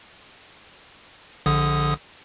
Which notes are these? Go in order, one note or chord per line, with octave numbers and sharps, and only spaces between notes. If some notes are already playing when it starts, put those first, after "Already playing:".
A#1 D3 D#6